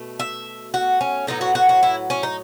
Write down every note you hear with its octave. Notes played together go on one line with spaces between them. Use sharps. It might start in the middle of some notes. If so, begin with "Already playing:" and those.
Already playing: B2 A3
E5
F#4
C#4
A2 F#3 B3 D#4
F#4
F#4
F#4
E4
C#4
D#4